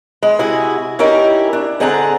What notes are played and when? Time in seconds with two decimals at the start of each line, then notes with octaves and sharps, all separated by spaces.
0.23 G#3
0.39 C3 E4 F#4 G#4
0.99 C#4 D#4 E4 G4 A#4
1.53 D4
1.80 D3 C4 G#4 F#5 A5 A#5